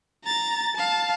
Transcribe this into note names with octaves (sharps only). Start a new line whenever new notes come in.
A#5 A6
F5 A5